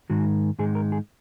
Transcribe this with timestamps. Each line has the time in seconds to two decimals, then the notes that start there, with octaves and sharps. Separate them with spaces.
0.10 G#2 D#3 G#3 D#4 F#4
0.59 G#2 D#3 G#3 D#4 G#4
0.75 A#4
0.92 G#4